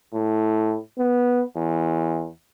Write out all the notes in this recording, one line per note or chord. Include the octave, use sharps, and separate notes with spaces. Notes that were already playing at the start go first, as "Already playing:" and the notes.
A2
B3
E2